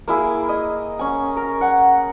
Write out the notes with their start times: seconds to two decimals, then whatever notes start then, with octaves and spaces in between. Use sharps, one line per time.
0.08 A#3 E4 G#4
0.49 D#5
0.99 C#4 G#5
1.37 A#4
1.61 F#5 G#5